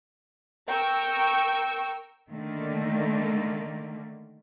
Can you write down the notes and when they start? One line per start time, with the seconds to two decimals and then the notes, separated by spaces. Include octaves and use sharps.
0.69 A#4 G5 C#6 E6
2.30 D3 D#3 A3 A#3